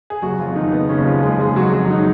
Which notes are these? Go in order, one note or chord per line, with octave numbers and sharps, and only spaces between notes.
G#4
F#1 F#3 F#4
F3 F4
F2
D#3 D#4
F#1 B3
C#3 C#4
F#1
F3 F4
F#1 G#3 G#4
G#3 G#4
F#1
F#3 F#4
F2 F#3 F#4
D#3 D#4